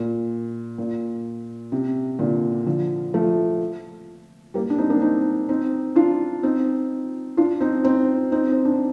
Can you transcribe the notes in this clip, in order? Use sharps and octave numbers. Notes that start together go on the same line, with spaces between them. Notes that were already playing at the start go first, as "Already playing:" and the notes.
Already playing: A#2
A#2
C3
A#2 D3
D3 F3
F3 A3
G3 A#3
D4
C4 D#4
A#3 D4
C4 D#4
C4 D#4
D4 F4
C4 D#4
D4 F4
C4 D#4
C4 D#4
C4 D#4
C4
D4